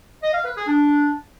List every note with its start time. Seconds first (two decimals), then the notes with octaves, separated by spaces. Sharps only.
0.22 D#5
0.33 F5
0.45 B4
0.56 G#4
0.67 D4